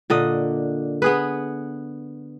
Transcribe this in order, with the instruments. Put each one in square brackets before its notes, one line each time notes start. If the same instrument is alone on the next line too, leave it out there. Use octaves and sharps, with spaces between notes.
[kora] A#2 D3 D#5
B3 G#4 B4